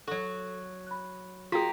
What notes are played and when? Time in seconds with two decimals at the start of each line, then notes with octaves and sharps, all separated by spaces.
0.07 F#3 F#4 A4
0.87 B5 F#6
1.52 A#3 F4 F#4 G#4 G5 A#5 C6 B6